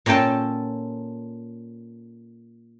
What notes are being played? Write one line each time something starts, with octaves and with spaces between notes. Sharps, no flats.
A#2 C#4 A4 G5 A5